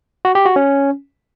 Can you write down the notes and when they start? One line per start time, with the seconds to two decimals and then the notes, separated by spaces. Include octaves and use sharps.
0.25 F#4
0.35 G4
0.46 F#4
0.56 C#4